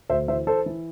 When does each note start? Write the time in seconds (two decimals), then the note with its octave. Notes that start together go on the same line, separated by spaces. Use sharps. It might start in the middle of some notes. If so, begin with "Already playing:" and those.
0.09 D2 C5 E5
0.28 E3 C5 E5
0.47 E3 A4 C5
0.66 E3